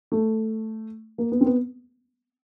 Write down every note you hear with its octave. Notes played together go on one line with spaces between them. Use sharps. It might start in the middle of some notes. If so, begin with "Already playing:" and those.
A3
A#3
B3
C4
B3